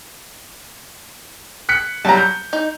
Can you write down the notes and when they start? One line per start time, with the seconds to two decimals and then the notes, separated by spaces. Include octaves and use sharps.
1.69 F#6 B6 C#7
2.05 F#3 G3 A5 A#5
2.17 G6
2.53 D#4